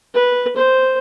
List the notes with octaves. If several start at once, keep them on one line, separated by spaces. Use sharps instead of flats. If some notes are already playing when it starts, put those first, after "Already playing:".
B4
C5